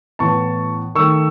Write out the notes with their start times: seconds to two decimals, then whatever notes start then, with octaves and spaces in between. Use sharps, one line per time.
0.19 A2 E3 B3 A5 C#6
0.95 D#3 A3 C#6 E6